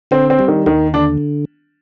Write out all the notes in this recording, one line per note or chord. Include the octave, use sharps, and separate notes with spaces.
D3 C4
C4
G3
D#3
D#2 D#3
D3 D4